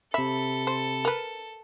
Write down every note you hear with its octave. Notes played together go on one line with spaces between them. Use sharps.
C3 A4 E5 B5
C5
A#4 B4